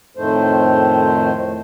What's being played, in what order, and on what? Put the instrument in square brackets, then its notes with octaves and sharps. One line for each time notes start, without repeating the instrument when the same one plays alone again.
[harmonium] F2 A2 D#3 A3 C5